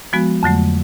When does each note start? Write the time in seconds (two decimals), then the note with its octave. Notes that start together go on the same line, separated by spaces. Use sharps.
0.13 F3 G#3 B3 F#4
0.43 F2 D3 F#3 A3